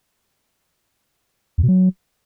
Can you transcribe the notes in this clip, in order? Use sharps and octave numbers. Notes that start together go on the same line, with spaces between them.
E2
B2
F#3